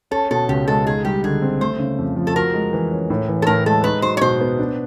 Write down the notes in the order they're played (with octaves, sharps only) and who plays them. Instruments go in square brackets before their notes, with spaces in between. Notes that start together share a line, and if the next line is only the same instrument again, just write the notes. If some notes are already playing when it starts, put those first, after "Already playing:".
[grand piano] C#4 [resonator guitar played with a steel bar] A4
[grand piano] B2 [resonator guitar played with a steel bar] A4
[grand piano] C#2 [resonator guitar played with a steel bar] G4
[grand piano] G#3 [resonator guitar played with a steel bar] A4
[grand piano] D#4 [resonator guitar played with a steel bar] G#4
[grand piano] G3 [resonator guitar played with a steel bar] G4
[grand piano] D3 [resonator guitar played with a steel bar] G#4
[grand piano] C4
[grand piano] A3 [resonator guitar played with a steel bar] C5
[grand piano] C#3
F2
F3
[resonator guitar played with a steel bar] A4
[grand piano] F#4 [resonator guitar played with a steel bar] A#4
[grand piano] G#3
E3
C#4
A2
E3
[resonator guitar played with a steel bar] A4
[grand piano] A2 [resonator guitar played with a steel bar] A#4
[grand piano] G#3 [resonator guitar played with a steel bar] A4
[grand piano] D#4 [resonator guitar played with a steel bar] B4
[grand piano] F#3 [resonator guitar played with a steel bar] C5
[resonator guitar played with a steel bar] C#5
[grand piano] B2 [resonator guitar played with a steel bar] C5
[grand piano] B3
D4